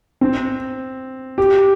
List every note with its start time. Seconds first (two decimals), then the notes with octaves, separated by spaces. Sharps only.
0.21 C4
1.38 G4